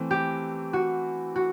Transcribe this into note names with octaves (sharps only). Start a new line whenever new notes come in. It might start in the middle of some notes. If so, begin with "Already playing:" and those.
Already playing: E3 A3 C4
G4
F#4
F#4